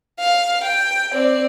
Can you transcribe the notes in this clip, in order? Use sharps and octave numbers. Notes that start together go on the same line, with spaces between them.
F5
G5
C4 D5